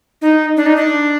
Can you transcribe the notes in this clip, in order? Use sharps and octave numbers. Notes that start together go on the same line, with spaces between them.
D#4
D4
D#4
D4